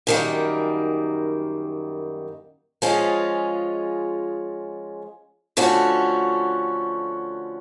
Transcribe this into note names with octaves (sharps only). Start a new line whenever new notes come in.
F#2 D#3 G3 A#3
F3 G#3 C#4 F4 G#4
D3 F3 A3 C#4 F#4